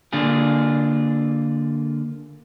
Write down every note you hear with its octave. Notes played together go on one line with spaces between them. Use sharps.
D3 A#3 D4 F4 G#4